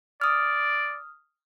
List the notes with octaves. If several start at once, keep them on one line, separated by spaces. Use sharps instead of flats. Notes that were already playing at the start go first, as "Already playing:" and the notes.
D5 D#6 F6